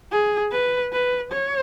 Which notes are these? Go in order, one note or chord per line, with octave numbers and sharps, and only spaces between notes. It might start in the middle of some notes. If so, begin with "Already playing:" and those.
G#4
B4
B4
C#5